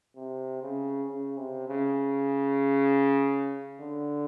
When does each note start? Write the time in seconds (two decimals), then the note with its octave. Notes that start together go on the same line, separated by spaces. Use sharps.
0.16 C3
0.62 C#3
1.08 C#3
1.37 C3
1.69 C#3
3.81 D3